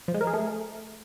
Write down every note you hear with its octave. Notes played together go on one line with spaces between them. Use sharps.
F3
G#3
A#4
G#4
A3